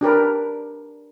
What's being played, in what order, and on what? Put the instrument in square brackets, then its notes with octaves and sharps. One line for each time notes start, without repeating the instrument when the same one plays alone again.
[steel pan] D4 G4 A#4 B4